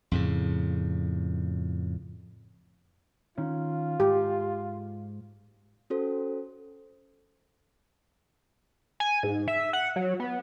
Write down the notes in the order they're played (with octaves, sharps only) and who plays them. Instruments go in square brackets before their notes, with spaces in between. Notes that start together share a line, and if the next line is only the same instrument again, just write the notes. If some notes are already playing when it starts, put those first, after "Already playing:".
[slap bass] F2 A2 C#3
[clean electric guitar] D#3 C#4 [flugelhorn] F4
[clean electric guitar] G#2 [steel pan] G4
[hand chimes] C#4 F#4 A4 C5
[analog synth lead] G#5
G#2
E5
F#5
F#3
B3